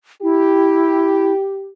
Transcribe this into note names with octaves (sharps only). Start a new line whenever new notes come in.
E4 G4